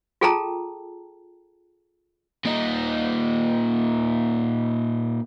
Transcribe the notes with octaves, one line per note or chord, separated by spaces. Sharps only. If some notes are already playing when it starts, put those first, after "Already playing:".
F4 G#4 A4 G5 A5 A#5
A#2 D#4